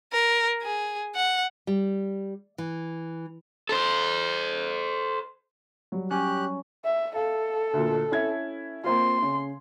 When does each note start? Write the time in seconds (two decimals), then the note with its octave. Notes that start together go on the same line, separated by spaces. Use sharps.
0.13 A#4
0.62 G#4
1.16 F#5
1.67 G3
2.58 E3
3.69 A4 C5
5.92 F#3 G3
6.11 C#4 G4 F#6
6.85 E5
7.15 A4 F5
7.73 D2 A#2
8.11 C#4 E4 G#6
8.84 A#3 C4 F4 C6
9.22 C#3